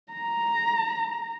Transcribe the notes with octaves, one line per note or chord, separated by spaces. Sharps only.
A#5